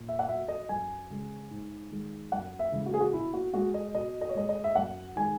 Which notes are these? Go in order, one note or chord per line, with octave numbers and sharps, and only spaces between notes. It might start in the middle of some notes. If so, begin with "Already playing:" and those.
Already playing: A#2
E5
F#5
F#3 E5
D#5
F#2 G#5
C#3 G#3
G#2
D#3 G#3
F#2 F#5
E5
C#3 E3 G#3
F#4
G#4
F#4
B2 E4
F#4
G#3 F#4
D#5
B2 D#5
D#5
C#5
G#3 D#5
D#5
E5
F#2 F#5
D#3 G#3 G#5